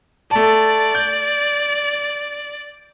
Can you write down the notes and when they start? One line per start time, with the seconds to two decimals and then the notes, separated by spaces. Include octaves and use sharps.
0.31 A3 D5 A5
0.95 G6